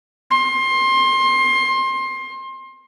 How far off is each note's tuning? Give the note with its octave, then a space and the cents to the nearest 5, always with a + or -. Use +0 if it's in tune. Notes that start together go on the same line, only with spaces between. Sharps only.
C6 +25